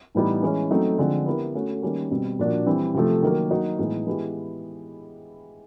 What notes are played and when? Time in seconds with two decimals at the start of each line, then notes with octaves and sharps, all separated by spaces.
0.15 A2 E3 G3 B3 D#4
0.42 E3 G#3 C#4
0.71 F#3 A3 C4 D#4
0.98 D3 F3 G#3 C4
1.26 B3 E4 G4 A#4
1.55 A3 C#4 F#4
1.82 D#3 G3 A#3 C#4
2.11 B2 G3 C4
2.39 A#2 F3 A#3 D4 F#4
2.66 E3 G3 C4
2.94 C3 F3 A3
3.23 D#3 F#3 A#3
3.51 F#3 A#3 D#4 F#4
3.79 A2 E3 G#3 B3 D#4
4.07 E3 G#3 B3 E4 G4